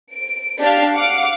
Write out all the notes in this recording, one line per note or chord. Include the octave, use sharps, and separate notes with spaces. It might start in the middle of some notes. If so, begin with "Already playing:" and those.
D7
D4 G4 F5
F5 F#5 D6